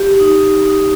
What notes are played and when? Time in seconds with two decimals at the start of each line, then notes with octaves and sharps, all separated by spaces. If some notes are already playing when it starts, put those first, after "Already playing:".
Already playing: G4
0.20 D#4
0.66 D#4